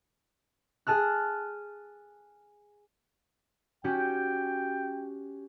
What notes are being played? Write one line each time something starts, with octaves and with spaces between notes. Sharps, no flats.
G#4 A5 F6 F#6
C#4 F#4 G4 G5